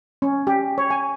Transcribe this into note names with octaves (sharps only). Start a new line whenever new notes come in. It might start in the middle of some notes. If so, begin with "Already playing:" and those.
C#4
G4
C#5
G#5